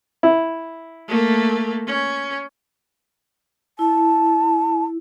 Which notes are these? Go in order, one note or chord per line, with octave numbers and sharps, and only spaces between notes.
E4
A3 A#3
C#4
E4 A5